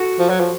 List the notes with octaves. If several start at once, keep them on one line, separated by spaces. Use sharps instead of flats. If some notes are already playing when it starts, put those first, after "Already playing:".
Already playing: F#4 A4
F3
F#3
F3